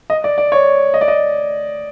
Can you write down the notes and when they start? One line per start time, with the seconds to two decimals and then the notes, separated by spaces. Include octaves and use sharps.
0.10 D#5
0.24 D5
0.38 D5
0.52 C#5
0.94 D#5
1.01 D5
1.08 D#5